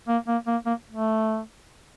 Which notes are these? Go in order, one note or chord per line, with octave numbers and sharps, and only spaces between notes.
A#3
A#3
A#3
A#3
A3